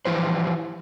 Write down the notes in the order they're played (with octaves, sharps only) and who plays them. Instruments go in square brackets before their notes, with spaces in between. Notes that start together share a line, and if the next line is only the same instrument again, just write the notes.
[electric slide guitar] E3 F3 E4 G4 B4 C5